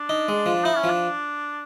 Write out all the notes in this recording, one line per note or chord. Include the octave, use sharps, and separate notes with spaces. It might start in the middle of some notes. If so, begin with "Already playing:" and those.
Already playing: D4
D#4
G#3
F3
D#4 E4
C#4
F3
D4